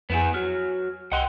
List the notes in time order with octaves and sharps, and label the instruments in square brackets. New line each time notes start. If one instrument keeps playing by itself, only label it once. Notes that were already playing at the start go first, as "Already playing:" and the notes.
[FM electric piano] F2 [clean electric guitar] B3 E4 G#4
[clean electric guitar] F#3 [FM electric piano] F6
[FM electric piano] C2 D#5 F#6 [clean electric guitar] F#5 G5 C6